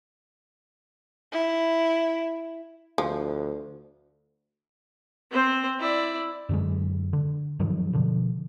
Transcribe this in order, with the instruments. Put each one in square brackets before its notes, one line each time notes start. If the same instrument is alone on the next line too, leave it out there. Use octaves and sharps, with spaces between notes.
[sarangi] E4
[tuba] D2 [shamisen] F3
[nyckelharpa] C4 C5
E4 D5
[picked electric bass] F#2 D3 F#3 G#3
D3
G2 D#3 F3 F#3
B2 D3 F3